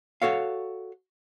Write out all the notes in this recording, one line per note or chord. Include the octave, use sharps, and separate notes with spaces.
F#4 A4 C#5 F5